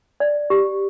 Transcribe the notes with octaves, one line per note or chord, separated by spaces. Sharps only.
D5
G4